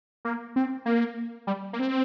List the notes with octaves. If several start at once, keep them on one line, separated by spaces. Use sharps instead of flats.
A#3
C4
A#3
G3
A#3
C4